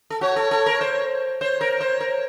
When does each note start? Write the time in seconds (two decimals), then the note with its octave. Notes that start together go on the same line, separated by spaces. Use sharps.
0.10 A4
0.21 F#4 C#5
0.36 A4
0.51 A4
0.66 A#4
0.81 C5
1.41 C5 C#5
1.61 A#4
1.81 C5
2.00 A#4